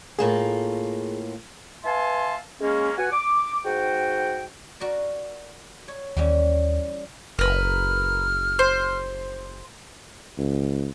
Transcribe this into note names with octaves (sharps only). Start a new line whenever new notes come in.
A2 A#3 F4 G#4
B4 E5 F5 G#5 A5 C6
G#3 A#3 C#4
B3 F#4 F#5 G#5
D6
G#2 F#4 G5
F#4 A#4 D5
C#5
D#2 E3 G3 C#4
F#1 A#4 B4 F6
C5
C#2